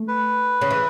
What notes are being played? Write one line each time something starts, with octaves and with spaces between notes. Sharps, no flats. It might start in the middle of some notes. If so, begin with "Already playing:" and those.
Already playing: A3
B4
C#3
E3